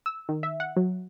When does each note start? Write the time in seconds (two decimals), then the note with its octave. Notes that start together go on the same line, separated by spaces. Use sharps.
0.06 E6
0.29 D#3
0.43 E5
0.60 F#5
0.77 F#3